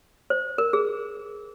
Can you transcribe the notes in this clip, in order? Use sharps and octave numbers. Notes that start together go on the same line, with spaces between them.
C5
A#4
G#4